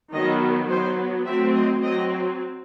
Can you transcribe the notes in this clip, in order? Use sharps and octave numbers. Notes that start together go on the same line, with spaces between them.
D#3 F#3 B3 D#5
F#3 B3 C5
F#3 A3 C4 E5
D#5
F#3 C4 D#5